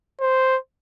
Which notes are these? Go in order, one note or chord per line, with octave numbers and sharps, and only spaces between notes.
C5